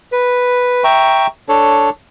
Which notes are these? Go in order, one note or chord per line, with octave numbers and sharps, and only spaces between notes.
B4
E5 G5 A#5 C#6
D4 A4 C#5